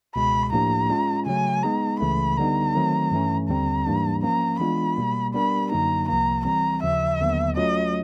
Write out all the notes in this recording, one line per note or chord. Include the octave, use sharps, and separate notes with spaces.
C#2 B2 G#3 B5
A2 F3 A#3 D4 G4 A#5
G#3 C#4 F4
C#3 F#3 A3 G#5
G#3 B3 D#4 G#4 A#5
C#2 C#3 E3 A3 B5
D3 G3 B3 D#4 A#5
D#3 F#3 A3 C4
G2 E3 A3 C#4
D#2 D3 G3 C4 A#5
G#2 E3 G3 A#3 D4
F3 A#3 C#4 A#5
E3 G#3 B3 D4 F4 B5
B2 G3 A#3
G3 B3 D4 G4 A#4 B5
F#2 D3 F#3 A#3 D#4 A#5
C2 C3 F3 A#3 A#5
E3 G3 C4 A#5
D#2 C#3 F3 E5
D#2 D3 F#3 B3
F#3 A3 C#4 F4 D#5